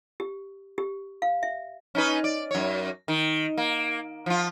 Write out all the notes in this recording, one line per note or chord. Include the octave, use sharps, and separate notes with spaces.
G4
G4
F5
E5
C#4 D#4 B4
D5
F#2 C#5
D#3
A#3
F3 F4